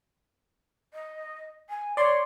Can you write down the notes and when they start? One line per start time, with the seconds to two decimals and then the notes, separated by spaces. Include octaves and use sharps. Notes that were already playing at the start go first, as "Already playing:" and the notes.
0.94 D#5
1.70 G#5
1.97 C#5 D5 C6